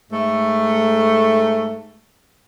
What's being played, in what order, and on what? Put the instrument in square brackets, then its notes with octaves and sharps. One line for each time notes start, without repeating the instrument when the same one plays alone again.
[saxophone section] G#2 A3